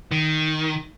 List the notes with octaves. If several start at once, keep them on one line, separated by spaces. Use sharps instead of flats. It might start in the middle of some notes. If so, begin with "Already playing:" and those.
D#3